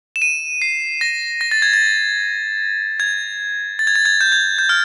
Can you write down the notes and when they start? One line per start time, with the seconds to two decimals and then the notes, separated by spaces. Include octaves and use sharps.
0.16 E7
0.22 D#7
0.62 C7
1.01 A#6
1.41 A#6
1.51 A6
1.62 G#6
1.74 A6
3.00 G#6
3.79 A6
3.87 G#6
3.96 A6
4.05 G#6
4.21 G6
4.32 G#6
4.59 G6
4.69 F6